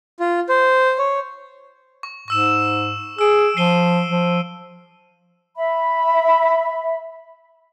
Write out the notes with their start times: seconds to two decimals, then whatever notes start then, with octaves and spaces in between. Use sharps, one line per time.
0.20 F4
0.49 C5
0.98 C#5
2.03 C#6
2.28 G#2 C#6 E6 E7
3.19 G#4 E6 D7
3.57 F3 C7 D#7 G7
4.09 F3
5.56 E5 B5